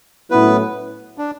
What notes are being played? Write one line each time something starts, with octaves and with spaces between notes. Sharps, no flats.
A2 F#3 B3 C#4 E4 B4
D4